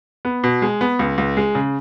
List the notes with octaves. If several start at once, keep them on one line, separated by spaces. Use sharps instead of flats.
B3
B2
G#3
B3
C#2
C#2
G#3
C#3